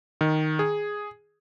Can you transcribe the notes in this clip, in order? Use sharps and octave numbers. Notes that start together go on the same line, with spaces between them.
D#3
G#4